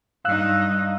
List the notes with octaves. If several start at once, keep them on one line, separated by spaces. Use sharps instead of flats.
G2 D#4 F5 E6 F#6